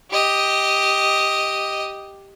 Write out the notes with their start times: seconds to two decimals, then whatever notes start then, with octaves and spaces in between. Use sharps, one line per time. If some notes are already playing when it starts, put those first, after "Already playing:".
0.11 G4 D#5